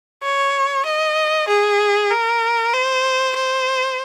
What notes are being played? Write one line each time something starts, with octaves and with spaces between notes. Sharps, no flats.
C#5
D#5
G#4
A#4
C5
C5